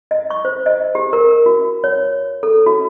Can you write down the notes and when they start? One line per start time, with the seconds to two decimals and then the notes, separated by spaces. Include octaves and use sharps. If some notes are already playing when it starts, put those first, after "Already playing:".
0.11 D#5
0.30 C#6
0.45 C5
0.66 D#5
0.95 G4
1.13 A#4
1.46 F#4
1.84 C#5
2.43 A4
2.66 F#4